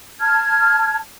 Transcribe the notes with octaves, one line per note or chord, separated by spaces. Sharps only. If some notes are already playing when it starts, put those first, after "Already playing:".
A5 F6 G#6